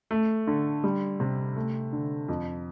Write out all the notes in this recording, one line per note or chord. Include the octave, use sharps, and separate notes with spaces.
A3
D3
G3
C3
A3
D3
F2